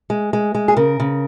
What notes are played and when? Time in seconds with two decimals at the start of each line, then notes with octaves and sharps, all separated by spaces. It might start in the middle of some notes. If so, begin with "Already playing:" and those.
0.10 G#3
0.33 G#3
0.55 G#3
0.68 G#4
0.77 C#3 A#4
1.00 C#3